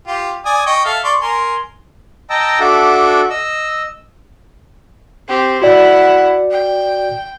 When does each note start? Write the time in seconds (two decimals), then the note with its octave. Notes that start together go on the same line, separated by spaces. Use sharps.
0.07 F4 G4
0.46 D5 G#5 D#6
0.66 D#5 G5 C#6
0.85 A4 E5 F5
1.04 D5 C6 C#6
1.21 A#4 G#5 C6
2.30 D#5 G5 A5 A#5 E6
2.60 D4 F#4 A4 E5 F#5 D6
3.30 D#5 E6
5.28 C4 G4
5.62 E4 F#4 D5 F#5
6.51 G5